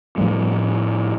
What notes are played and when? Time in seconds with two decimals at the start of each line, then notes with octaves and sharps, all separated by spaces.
0.18 A2 F3 G3 A3